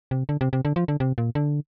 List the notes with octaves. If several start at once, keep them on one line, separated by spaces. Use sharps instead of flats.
C3
D3
C3
C3
D3
F3
D3
C3
A#2
D3